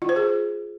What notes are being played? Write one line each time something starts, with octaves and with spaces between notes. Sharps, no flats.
F4
C5
G#4